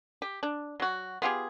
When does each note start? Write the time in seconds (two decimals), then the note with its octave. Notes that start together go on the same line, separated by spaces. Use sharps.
0.22 G4
0.43 D4
0.80 F#3 F#4
1.22 B3 F4 G4 G#4